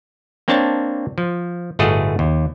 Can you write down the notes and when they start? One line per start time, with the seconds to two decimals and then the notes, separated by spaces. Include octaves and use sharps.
0.48 A#3 C4 D4 C#5 A5
1.18 F3
1.79 G1 A2 A3 F#4 G#4 D#5
2.19 D#2